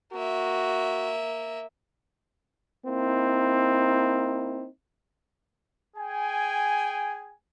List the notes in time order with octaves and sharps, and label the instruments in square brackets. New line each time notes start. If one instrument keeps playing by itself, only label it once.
[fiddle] A#3 E5 [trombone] F#4
[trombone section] A#3 C4 D#4 E4
[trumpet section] G#4 G5 G#5